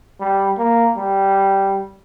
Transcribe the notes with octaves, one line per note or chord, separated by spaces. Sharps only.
G3
A#3
G3